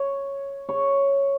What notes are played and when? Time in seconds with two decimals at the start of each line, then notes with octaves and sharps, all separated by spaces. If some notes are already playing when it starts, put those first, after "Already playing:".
Already playing: C#5
0.69 C#5